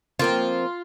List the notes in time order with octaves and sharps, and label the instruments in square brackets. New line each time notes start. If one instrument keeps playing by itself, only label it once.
[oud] F3 A#3 C4 [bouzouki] F4